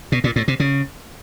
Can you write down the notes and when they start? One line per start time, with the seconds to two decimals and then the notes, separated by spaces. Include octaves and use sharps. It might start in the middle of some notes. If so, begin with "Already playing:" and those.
0.12 B2
0.24 A#2
0.36 A2
0.48 C3
0.60 C#3